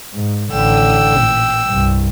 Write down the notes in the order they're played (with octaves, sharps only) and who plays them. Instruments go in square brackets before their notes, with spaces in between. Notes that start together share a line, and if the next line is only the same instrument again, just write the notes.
[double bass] G#2
[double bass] A1 D3 [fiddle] G5 E6
[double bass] A#2
C2 G2